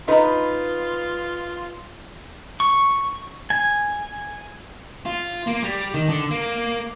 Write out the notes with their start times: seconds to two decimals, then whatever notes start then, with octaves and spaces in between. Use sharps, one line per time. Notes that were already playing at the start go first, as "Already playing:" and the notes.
0.08 D#4 F4 B4 D#5 A#5
2.60 C#6
3.50 G#5
5.06 F4
5.47 A#3
5.64 G3
5.94 D#3
6.09 D3
6.31 A#3